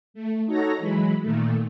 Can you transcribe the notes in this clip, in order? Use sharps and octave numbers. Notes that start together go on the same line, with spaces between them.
A3
D#4 F#4 A4 C#5 A#5 A#6
E3 F#3 G#3 B5
A#2 D#3 A3